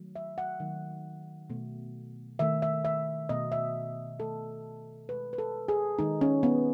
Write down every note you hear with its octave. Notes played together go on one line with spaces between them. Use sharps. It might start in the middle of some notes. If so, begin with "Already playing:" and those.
Already playing: D#3 F#3 A3
E5
F#5
D#3 F#3 A3
B2 A3
D#3 A3 E5
E5
E5
B2 A3 D#5
E5
D#3 A3 A4
B2 G#3 B4
B4
A4
G#4
D#3 G#3 D#4
C#4
B3